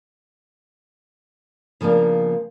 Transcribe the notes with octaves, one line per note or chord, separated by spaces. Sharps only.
C#3 F3 A#3 B3 D4